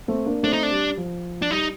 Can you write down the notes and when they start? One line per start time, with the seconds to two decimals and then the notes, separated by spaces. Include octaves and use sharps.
0.08 A3 C4
0.26 A#3 D4
0.43 A3 C4 D4
0.53 D#4
0.63 D4
0.71 G3
0.97 F3
1.42 D4
1.51 G3 D#4